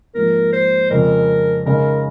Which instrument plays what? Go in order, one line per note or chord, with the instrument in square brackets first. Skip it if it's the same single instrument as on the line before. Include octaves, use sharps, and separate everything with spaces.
[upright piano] G#2 F3 A#3 [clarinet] A#4
[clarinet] C5
[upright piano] F2 C#3 G#3 [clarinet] A#4
[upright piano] C#3 G#3 D#4 [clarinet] A#4